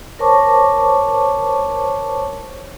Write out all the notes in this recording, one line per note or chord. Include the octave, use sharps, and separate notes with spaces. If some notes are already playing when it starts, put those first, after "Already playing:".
A#4 C5 C#5 A5 C#6 D6